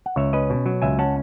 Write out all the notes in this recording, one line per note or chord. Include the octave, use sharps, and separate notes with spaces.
F#5
C#2 C#5 E5
C#4 B4 D#5
B2
F#3
C#2 E5 G#5
C#4 F#5 A5